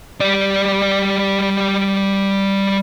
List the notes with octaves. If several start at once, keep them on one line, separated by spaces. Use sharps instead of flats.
G3 D5